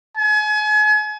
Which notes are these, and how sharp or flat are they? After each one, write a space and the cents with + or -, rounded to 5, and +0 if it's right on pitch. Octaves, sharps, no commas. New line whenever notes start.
G#5 +35